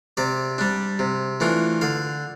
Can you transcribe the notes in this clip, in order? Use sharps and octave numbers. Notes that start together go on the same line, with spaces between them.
C3 D5
G3 D4
C3
E3 A3 D4 F4
D3 F5